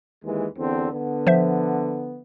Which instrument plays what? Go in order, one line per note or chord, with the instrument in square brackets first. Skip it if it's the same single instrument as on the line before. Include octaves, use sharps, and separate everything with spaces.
[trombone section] D#2 E3 G#3
E2 D3 C4
D3 B3
[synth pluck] F3 C5 E5